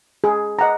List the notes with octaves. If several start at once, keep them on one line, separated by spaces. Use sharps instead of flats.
G#4
D#5 F#5 A#5